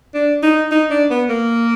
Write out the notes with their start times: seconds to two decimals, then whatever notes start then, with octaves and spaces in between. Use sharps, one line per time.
0.14 D4
0.43 D#4
0.71 D#4
0.90 D4
1.10 B3
1.29 A#3